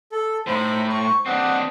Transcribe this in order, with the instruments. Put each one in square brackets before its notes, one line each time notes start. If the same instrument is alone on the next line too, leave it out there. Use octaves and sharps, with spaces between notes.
[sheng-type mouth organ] A4
[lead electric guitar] A2 [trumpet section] D#4 E5 B5 [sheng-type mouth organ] C5
[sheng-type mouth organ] C5 [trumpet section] C#6
[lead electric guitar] C4 D4 [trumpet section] G4 D#5 [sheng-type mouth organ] F#5